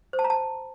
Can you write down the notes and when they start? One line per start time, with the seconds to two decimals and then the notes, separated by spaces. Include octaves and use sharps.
0.13 C5
0.19 A5
0.24 A#5
0.30 A5